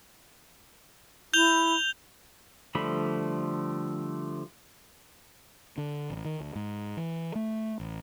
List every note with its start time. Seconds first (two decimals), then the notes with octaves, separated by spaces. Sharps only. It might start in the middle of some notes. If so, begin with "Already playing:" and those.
1.33 E4 G6 F7 G7
2.75 D3 F3 G3 A3 B5
5.78 D3
6.10 A1
6.25 D#3
6.40 D2
6.56 G#2
6.97 E3
7.35 A3
7.80 A1